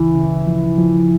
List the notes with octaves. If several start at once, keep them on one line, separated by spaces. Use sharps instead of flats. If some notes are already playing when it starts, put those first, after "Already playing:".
Already playing: D2 C#3 E3
C#3
F3
F3